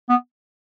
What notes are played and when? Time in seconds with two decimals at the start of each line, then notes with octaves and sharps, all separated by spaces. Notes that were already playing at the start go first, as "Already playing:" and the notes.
0.09 B3